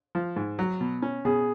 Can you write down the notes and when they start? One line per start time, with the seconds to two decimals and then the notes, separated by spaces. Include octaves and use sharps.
0.15 F3
0.36 G#2
0.59 F#3
0.81 B2
1.02 C#4
1.25 B2 G#4